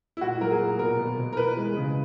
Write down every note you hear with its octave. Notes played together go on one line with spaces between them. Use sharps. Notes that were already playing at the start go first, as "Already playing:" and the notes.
E4
A#2 F#4
F#3 A#4
G#4
A#2
B2 A#4
B2
B2
A#4
E3 B4
G#3
C#3